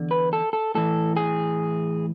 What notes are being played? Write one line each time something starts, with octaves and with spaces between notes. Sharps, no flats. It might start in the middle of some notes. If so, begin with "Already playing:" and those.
Already playing: E2 D3
B4
A4
A4
A2 E3 A4
G#4